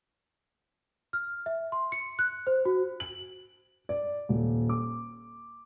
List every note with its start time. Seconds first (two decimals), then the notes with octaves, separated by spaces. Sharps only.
1.13 F6
1.46 E5
1.72 C6
1.92 C#7
2.19 F#6
2.47 C5
2.65 F#4
3.00 F#7
3.89 D5
4.29 D#1
4.69 D6